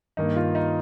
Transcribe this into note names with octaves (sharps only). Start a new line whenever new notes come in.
G2 D#3 A#3 D#4
F4
D#4